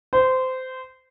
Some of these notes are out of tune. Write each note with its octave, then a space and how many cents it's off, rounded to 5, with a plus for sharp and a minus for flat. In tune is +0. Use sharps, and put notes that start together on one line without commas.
C5 -20